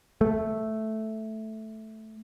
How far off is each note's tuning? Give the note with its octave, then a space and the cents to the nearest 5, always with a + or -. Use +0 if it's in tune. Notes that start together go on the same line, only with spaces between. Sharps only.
A3 -5